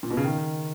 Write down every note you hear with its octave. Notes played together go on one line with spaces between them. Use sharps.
A#2
B2
C#3
D#3